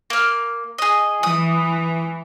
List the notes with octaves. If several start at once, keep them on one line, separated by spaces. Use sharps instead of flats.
A#3 F6
G#4 D#5
E3 D#6